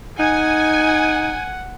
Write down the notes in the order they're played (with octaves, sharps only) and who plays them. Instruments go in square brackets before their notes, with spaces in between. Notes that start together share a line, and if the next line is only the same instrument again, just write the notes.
[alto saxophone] D#4 [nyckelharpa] F#5 [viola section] G#5